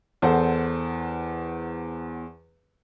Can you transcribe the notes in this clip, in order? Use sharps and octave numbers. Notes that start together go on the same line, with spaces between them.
E2 A4 C5 F#5